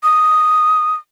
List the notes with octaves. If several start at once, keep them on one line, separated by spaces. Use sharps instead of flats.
D#6